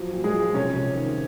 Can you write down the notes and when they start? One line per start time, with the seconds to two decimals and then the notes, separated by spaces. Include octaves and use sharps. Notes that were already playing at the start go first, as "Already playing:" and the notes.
Already playing: F3 F#3
0.13 A#2
0.24 G#3 G#4
0.34 F3
0.54 C3 C#4 C#5
0.75 C3
0.95 D#3